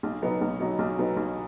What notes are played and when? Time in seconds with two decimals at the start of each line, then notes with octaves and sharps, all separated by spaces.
0.03 B1
0.22 B2 F#3 B3 D#4
0.41 B1
0.60 B2 F#3 B3 D#4
0.79 B1
0.98 B2 F#3 B3 D#4
1.17 B1